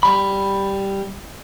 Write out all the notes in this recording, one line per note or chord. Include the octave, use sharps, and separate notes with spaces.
G3 B5